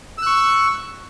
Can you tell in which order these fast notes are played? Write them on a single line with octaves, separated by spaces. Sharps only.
E6 F#6 C#6